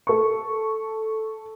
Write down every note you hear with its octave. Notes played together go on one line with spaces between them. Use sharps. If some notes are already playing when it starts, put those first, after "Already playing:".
A4 C#6